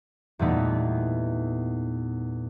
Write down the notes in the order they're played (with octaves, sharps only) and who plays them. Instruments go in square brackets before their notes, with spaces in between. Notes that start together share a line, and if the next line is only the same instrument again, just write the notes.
[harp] E2 A#2 G3 A3 B3 D#4